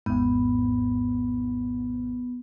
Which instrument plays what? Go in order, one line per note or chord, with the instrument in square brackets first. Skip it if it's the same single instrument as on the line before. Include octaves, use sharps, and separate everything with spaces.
[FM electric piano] G#1 E2 G#2 [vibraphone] B3